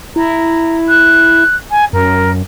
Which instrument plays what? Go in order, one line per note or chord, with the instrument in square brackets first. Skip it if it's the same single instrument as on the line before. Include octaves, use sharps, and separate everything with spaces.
[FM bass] E4 [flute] A#5
[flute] F#6
G#5
[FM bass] F#2 [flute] A#4